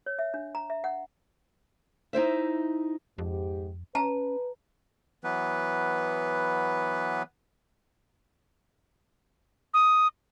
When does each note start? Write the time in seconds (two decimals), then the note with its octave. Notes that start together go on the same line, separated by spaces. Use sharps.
0.06 C#5
0.19 E5
0.34 D4
0.55 A#5
0.70 E5
0.84 F#5
2.13 D#4 E4 C5 E5
3.18 F2 G#2 G4
3.95 C#4 B4 A5 A#5
5.24 E3 F#3 B3 B4
9.74 D#6